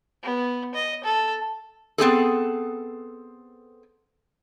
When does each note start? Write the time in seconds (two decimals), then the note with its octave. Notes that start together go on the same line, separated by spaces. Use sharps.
0.23 B3
0.74 D#5
1.04 A4
1.98 B3 C4 G#4 A4